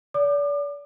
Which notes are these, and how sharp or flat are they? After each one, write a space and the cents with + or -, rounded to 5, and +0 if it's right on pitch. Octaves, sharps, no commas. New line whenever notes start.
D5 -35 D6 +35